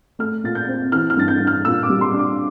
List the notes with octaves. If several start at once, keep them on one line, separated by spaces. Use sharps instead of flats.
A3 F6
A#2 A6
G6
C4
E3 F6
F6
G2 A6
G6
G2
F6
A#2 E6
D6
G3
C6
D4
D6